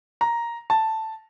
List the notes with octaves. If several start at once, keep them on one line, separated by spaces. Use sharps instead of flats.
A#5
A5